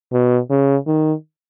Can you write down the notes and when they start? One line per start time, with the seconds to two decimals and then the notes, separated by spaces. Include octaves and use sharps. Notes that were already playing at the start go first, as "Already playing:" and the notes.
0.13 B2
0.50 C#3
0.87 D#3